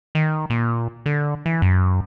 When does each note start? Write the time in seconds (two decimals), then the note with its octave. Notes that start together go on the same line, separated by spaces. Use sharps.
0.15 D#3
0.50 A#2
1.06 D3
1.46 E3
1.62 F#2